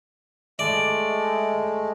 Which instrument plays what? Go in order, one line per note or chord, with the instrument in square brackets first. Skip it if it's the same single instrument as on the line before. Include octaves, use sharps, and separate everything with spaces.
[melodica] G#3 A3 [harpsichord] D5